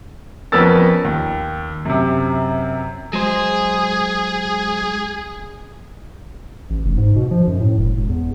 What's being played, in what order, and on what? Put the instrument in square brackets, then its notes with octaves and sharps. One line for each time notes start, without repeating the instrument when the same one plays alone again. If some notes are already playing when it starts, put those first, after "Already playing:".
[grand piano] F2 B3 C#4 A#4 E6 A6
D#2
F#2 C3
[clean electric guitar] F#3 G#3 C5 [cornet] G#4
[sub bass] A1
F1
G#2
B2
F3
F#2
A2
E1
E1
E2